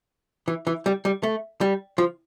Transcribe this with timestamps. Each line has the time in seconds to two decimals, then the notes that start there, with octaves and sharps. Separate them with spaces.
0.48 E3
0.67 E3
0.86 G3
1.05 G3
1.23 A3
1.61 G3
1.98 F3